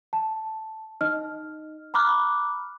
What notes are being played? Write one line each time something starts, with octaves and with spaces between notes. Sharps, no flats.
A5
D#4 D#5 F6
A#5 B5 D6 F6 F#6